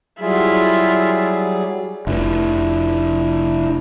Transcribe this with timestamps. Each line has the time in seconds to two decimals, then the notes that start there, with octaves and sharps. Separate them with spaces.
0.21 F#3 G3 E4 F4 G#4
2.07 F1 D4 E4